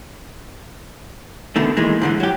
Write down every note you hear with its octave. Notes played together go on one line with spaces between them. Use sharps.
B2 D3 D#3 A3
A#2 D#3 E3 G#3
G#2 D3 E3
F#3 G4